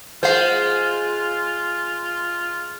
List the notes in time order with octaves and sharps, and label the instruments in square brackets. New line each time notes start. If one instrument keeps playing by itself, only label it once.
[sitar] G#3 [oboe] F4 [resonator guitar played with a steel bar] C5 F5